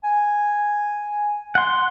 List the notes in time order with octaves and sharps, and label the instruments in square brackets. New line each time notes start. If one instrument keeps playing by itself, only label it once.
[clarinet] G#5
[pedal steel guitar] F#5 C6